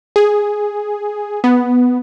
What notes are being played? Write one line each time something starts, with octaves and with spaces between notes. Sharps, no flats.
G#4
B3